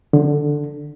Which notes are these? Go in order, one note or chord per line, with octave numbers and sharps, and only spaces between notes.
D3